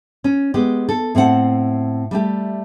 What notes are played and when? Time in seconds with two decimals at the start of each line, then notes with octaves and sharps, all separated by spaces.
0.24 C#4
0.54 G#3 B3 G4
0.89 A4
1.15 A2 C4 F4 F#5 A5
2.11 G3 A3 G4